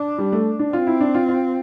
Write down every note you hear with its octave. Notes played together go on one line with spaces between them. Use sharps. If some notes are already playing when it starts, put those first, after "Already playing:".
Already playing: D4
G3
A3
D4
C4 F4
E4
D4
F4
F4